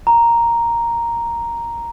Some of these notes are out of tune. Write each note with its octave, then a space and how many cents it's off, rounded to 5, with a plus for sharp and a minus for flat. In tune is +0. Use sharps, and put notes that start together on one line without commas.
A#5 +0